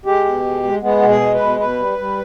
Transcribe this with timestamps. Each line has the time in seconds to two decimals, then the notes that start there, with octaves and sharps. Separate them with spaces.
0.05 G#3 G4
0.25 B2
0.44 G#3
0.63 G#3
0.83 G#3 B3
1.02 B2
1.09 G#4
1.21 G#3
1.34 B4
1.40 B2
1.60 B2 B4
1.79 G3
1.98 G3